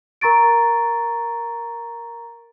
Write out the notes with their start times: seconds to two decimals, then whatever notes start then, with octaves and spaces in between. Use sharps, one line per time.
0.21 A#4 A#5 C#6 A6 D7